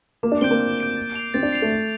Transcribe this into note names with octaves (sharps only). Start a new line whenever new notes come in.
A#3 D6
D4
C4 G6 D7 G7
A#3
D6
G6 D7 G7
A6
C7 F7
C4 A6
D4
C7 F7
A3
A6